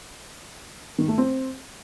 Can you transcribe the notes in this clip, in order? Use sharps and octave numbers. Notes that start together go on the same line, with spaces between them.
D#3
A3
C4